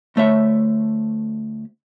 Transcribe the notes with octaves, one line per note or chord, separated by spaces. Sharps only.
D2 A3 C#5 E5